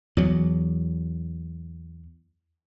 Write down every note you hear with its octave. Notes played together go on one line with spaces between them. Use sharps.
E2 F#3